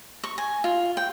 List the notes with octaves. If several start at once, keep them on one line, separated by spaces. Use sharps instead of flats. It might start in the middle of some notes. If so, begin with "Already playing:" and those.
C#6
G#5
F4
G5